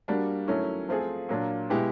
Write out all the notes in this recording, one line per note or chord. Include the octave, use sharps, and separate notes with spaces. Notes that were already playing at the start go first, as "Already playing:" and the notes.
G3 A#3 D4 F#4
D#3 F#3 A3 C#4 E4
F3 A3 C4 F4 G#4
A#2 F#3 A#3 D4
B2 G#3 B3 E4 G4